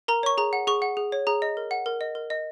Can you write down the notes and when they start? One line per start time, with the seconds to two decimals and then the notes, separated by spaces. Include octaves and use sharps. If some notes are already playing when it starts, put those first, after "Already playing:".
0.08 A#4 A#5
0.23 C#5 C#6
0.38 G#4 A#5
0.53 F#5
0.67 G#4 C#6
0.82 F#5
0.97 G#4
1.12 C#5
1.27 G#4 A#5
1.42 D#5
1.57 A#4
1.71 F#5
1.86 A#4
2.01 D#5
2.15 A#4
2.30 D#5